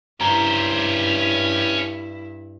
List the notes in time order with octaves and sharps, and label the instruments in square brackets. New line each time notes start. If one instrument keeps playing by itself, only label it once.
[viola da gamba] G2 E4 [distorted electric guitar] C#4 C5 [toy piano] A#5